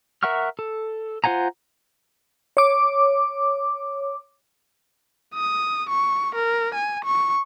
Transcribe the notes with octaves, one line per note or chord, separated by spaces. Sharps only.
A#4 E5 F#5 C#6 F6
A4
F4 C5 F#5 G#5 A#5
C#5 D6
D#6
C#6
A#4
G#5
C#6